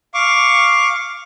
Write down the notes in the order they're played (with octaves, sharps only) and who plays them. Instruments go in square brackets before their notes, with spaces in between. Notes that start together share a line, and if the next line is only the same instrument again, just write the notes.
[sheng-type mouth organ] F5 C#6 D6